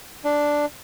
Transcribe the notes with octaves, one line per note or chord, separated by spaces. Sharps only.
D4